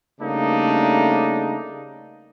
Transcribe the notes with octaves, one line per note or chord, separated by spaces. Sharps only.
C#3 G3 A3 A#3 D4 D#4